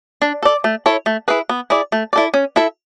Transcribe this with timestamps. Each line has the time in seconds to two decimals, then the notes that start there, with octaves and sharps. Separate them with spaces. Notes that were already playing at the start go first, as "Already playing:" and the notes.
0.22 D4
0.43 A4 D5
0.64 A3
0.86 E4 A4 C#5
1.06 A3
1.28 E4 G#4 B4
1.49 B3
1.70 E4 G#4 D5
1.92 A3
2.13 E4 A4 D5
2.34 C#4
2.56 E4 A4 E5